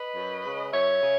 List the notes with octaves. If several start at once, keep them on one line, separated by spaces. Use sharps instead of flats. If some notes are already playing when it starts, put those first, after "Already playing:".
Already playing: B4 D#5
F#2
C#3 G#3
F#2 C#5 E5
C#3